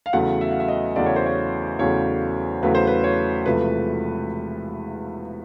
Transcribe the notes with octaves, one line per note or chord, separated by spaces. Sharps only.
F5
E2 C#3 F#3 A3 F#5
E5
F5
E5
D#5
E2 C#3 F#3 A3 D5
C#5
C5
C#5
E2 C#3 F#3 A3 C#5
E2 C#3 F#3 A3 B4
C5
B4
C#5
E1 E2 C3 F3 A3 B4